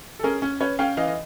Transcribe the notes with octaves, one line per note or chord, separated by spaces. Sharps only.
A4
C#4 G#4 A#4
C#4
C#4 B4 C#5
C#4 F5 G5
E3 D#5 F5
D#5